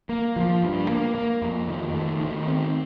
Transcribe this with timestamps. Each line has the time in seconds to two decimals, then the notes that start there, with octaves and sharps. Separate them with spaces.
0.09 A#3
0.36 F3
0.63 G2
0.89 A#3
1.15 A#3
1.42 F2
1.68 D#3
1.94 A3
2.21 D#3
2.48 C4